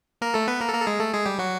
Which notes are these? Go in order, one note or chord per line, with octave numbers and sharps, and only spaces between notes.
A#3 A#4
A3 A4
B3 B4
A#3 A#4
A4
A#3 A#4
A4
G#3 G#4
A3 A4
G#3 G#4
G3 G4
F#3 F#4